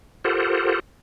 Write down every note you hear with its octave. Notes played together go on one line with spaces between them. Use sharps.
F4 G4 A4 A#4 C5 F#5